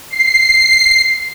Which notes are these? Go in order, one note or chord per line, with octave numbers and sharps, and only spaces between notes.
C7